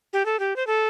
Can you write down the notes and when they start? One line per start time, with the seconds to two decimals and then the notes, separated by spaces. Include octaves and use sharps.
0.13 G4
0.26 A4
0.39 G4
0.56 C5
0.67 A4